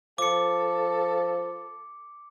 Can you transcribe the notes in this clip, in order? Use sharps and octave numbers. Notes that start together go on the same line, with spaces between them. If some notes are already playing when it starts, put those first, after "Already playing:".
F3 A4 D6 C#7